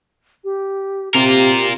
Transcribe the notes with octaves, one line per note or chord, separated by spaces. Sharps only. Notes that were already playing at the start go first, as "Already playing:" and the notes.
G4
C3 F4 G4 A#4